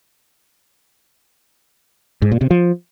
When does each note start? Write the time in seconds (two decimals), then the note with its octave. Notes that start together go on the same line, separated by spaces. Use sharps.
2.22 G#2
2.32 A#2
2.41 C3
2.51 F3